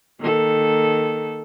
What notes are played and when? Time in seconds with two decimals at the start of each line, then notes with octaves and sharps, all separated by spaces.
0.20 D#3 A#3 A4